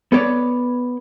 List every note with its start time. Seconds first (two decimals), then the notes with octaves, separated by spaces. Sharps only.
0.12 B3 A4 C#5 D5